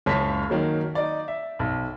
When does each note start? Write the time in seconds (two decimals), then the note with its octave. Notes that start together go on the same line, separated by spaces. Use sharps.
0.06 F#1 C#2 C#5 F5 A5 B6
0.50 D#3 F#3 A#3
0.95 D#4 D5
1.28 E5
1.59 B1